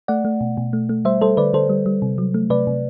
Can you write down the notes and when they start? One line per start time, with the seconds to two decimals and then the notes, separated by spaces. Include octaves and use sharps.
0.08 A3 D5 F#5
0.25 A3
0.41 B2
0.57 B2
0.73 A3
0.89 A3
1.05 G3 C5 E5
1.21 G3 A4 C5
1.37 D3 B4 D5
1.53 D3 A4 C5
1.69 G3
1.86 G3
2.02 C3
2.18 F#3
2.34 A3
2.50 C3 B4 D5
2.67 C3